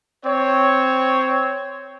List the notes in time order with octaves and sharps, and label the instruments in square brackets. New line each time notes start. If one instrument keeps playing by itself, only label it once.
[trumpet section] C4 C#5